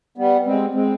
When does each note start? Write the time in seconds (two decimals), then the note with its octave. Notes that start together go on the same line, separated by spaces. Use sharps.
0.18 G3 B3
0.46 G#3 C4
0.74 G#3 C4